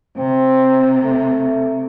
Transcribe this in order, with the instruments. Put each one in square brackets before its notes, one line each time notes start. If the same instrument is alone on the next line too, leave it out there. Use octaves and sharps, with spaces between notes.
[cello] C3 [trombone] C4
[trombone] A3